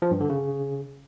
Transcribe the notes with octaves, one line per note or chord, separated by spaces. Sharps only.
F3
G2
D3
C#3